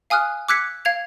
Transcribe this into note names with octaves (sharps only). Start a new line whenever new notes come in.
F5 G#5 D#6 F6 F#6
D6 E6 F#6 G#6 B6 C#7
F5 G#6 F7